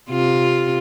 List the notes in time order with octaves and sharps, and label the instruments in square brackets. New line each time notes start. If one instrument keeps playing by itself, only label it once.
[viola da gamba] C3 F4